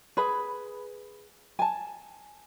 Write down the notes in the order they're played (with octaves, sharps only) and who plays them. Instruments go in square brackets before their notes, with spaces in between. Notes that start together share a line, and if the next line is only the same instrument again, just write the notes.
[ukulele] G#4 B4 B5
G#5 A5